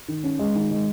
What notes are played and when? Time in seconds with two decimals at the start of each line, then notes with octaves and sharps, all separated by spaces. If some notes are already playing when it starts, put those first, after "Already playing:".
0.08 D#3
0.24 C#4
0.39 G#3
0.56 D#3
0.71 G#3